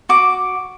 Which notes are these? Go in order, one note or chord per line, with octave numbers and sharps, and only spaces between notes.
F#4 D6